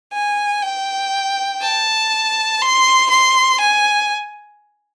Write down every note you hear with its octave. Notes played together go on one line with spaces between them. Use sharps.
G#5
G5
A5
C6
C6
G#5